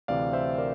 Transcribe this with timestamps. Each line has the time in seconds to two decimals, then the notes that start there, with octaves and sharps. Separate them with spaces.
0.08 D2 C3 E3 D5 F5
0.33 C5 E5
0.58 A#4 D5